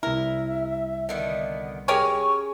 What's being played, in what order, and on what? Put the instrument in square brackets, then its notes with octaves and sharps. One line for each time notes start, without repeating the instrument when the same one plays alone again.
[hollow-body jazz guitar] C2 E4 [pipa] A#4 [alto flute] E5
[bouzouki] D3 D#3 B3
[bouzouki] C#4 G#4 G#5 [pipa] G4 A#4 C#5 [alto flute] C#6